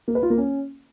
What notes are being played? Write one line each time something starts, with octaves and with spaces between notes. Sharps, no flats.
A#3
B4
F4
A#3
C#4